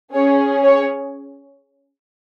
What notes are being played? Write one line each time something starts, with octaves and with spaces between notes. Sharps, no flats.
C#4 G#4 C#5
C#5